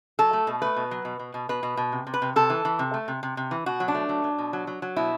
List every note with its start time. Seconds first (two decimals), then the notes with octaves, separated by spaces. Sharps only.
0.19 F#3 A4
0.33 A3
0.47 B2
0.62 A3 B4
0.76 B2
0.91 F#3
1.05 B2
1.19 B2
1.34 B2
1.49 B2 B4
1.63 B2
1.77 B2
1.92 C3
2.07 C3
2.14 B4
2.22 C3
2.36 C3 A4
2.50 E3
2.65 E3
2.79 C3
2.94 A3
3.08 C3
3.23 C3
3.37 C3
3.51 E3
3.66 B2 F#4
3.80 F#3
3.88 D4
3.95 A3
4.09 F#3
4.24 F#3
4.38 B2
4.53 F#3
4.67 F#3
4.82 F#3
4.96 B2 E4